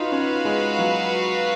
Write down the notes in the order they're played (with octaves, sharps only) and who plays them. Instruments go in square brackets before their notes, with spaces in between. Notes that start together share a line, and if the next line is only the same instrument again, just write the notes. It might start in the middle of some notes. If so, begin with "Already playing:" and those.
Already playing: [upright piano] D#4 F4 [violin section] F#4 B4 F5
[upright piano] C#4
G#3
F#3